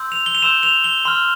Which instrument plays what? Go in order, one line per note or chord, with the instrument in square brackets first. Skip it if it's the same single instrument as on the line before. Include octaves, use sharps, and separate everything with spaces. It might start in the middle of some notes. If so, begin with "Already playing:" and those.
Already playing: [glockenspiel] C6 E6 G6
F7
G7
F7
C6 E6 G6 E7
F7
G7
C6 F6